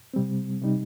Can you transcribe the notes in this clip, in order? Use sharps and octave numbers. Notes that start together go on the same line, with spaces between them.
C3 G3 C4
C3 G3 D#4